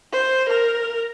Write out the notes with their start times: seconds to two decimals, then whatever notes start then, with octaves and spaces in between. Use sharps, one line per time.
0.12 C5
0.49 A#4